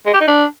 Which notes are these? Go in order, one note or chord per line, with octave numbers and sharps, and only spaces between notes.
G#3
G4
D#4
D4